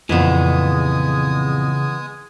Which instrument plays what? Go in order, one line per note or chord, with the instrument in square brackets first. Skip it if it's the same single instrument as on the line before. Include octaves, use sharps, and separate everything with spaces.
[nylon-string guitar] F2 A#2 [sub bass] C#3 [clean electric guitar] E3 B3 [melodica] G#3 G#5 D#6